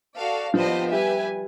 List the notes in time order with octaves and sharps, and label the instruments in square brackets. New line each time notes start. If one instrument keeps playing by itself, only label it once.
[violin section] F#4 A4 D5 F5
[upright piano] F3 [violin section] B3 D4 G4 C5 D#5
[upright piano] G3 [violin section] G4 B4 E5 G#5